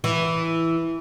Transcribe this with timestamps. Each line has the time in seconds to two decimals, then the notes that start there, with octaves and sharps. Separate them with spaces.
0.04 E3